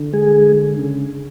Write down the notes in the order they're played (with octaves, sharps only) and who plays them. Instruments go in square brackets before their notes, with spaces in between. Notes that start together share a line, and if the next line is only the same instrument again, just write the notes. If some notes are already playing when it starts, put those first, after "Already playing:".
Already playing: [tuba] D3
[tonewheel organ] G#3 G#4
[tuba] C#3